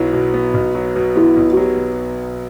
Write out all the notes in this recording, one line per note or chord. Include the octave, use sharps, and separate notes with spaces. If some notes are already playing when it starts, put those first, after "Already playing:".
Already playing: B1 F#3 B3 E4
B2
B3
B1
F#3
B2
B3 E4
B1
F#4
F#3 G4
B2